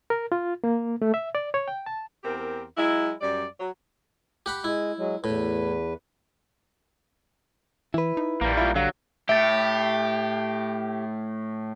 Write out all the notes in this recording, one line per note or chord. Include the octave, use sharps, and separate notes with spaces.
A#4
F4
A#3
A3
E5
D5
C#5
G5
A5
E2 C4 G4 A#4
F#3 G#3 E4
F#2 G3 D5
F#3
G4 F#5 B5
G#3 E4
F#3 G#3
E2 A2 B4
E3 E4 B4
D#4
A#1 G3 A#3
E4 F4
D3 F#3 G3 F5
A2 G4 E5 A6